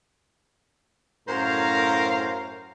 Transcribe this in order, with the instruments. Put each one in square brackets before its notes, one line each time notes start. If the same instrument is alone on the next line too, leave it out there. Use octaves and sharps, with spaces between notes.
[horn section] F#2 A2 A#4 C5 F5 A#5